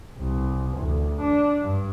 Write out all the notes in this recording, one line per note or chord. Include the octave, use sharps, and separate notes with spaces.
C2
D2
D4
G2